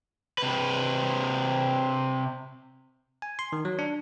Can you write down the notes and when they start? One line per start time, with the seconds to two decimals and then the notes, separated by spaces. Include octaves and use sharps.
0.38 C3 B4
3.22 G#5
3.39 C6
3.52 D#3
3.65 F#3
3.79 D4